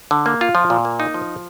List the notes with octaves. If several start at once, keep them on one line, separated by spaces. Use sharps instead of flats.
D3
A#3
F4
F3
A#2
A#3
D#4
F3